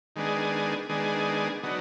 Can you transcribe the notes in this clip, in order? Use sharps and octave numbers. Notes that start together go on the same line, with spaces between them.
D#3 G#3 B3 D4 G#4
D#3 G#3 B3 D4 G#4
D3 F#3 B3 D#4